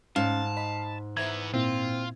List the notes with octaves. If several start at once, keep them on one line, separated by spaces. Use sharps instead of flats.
G#2 C#4 F5 A5
D#5 B5 B6
E3 B3 C5 E5 A#5 G#6
A#2 C4 E4 F4